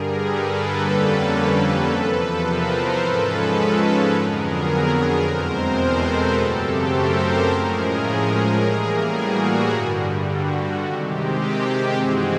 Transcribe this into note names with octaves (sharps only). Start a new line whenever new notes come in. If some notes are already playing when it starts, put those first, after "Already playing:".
Already playing: G2 D3 G3 G#4 A#4
A4 B4
F2 D3 G3 A#3 C#4
E2 C3 F3
A#4 C5
G#2 F3 G#3 C#4 A4 B4
F2 D3 F#3 B3 G#4 A#4
E2 B2 G#3 C4 A#4 C5
A4 B4
F#2 C#3 F#3 A3 C4 G4 A4
A#4 C5
A2 F3 G#3 C#4 G#4 A#4
A2 E3 G3 A#3
F#4 G#4
G2 D3 G3
F#4
C3 D#3 G#3 C4 G4
G4
G2 E3 G#3 C4 F#4 G#4